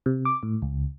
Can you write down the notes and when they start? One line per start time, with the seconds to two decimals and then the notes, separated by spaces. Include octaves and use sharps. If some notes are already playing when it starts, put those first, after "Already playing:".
0.06 C3
0.25 D6
0.43 A2
0.62 C#2